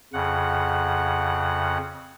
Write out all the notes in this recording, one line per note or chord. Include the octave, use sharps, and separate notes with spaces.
F2 C#3 F#5